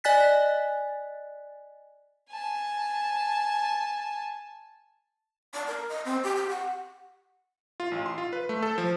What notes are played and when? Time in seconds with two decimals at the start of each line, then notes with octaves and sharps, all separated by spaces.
0.04 D5 D#5 G#5 F#6 A6 B6
2.31 G#5 A5
5.54 D5
5.67 A#4
5.89 D#5
6.05 C4
6.23 G4
6.35 G4
6.49 F#5
7.80 F4
7.91 A1
8.06 C6
8.18 F4
8.33 B4
8.49 A3
8.62 A4
8.78 F3